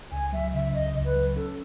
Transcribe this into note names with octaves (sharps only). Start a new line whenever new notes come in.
C#2 G#5
F#3 E5
C#3 E5
C#2 D#5
C#2
B4
F#3
C#4 A4